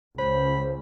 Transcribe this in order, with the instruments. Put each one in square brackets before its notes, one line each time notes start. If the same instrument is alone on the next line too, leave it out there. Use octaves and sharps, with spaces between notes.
[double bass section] C#2 [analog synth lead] C5 [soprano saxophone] B5